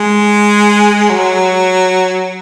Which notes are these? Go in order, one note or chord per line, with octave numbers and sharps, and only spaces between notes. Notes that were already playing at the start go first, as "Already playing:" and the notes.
Already playing: G#3
F#3